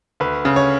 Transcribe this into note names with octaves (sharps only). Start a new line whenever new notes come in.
D2 B4
C#3
C#5